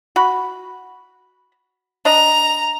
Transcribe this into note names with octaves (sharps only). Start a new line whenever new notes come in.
F#4 B5
D4 D#5 A#5